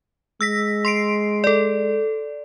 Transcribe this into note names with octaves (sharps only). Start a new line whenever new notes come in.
G#3 E6 A#6 B6
C6 C7 D7
A4 D5